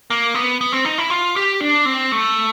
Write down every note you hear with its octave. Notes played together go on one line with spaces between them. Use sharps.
A#3
B3
B3
C4
D#4
E4
F4
G4
D4
C4
A3